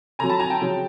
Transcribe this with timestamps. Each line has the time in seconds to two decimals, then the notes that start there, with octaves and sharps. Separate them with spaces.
0.19 D3 F#3 G#5 A#5
0.30 A5 B5
0.40 G#5 A#5
0.50 G5 A5
0.61 C#3 F#3